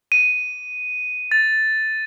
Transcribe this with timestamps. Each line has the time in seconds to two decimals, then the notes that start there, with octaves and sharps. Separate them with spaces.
0.12 D#7
1.31 A6